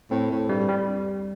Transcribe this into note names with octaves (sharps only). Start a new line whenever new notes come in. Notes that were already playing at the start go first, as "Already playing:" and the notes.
A2 C4
A2
G2 G3
G2
G3